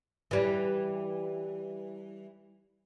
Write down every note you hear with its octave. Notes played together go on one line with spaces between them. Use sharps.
E3 G3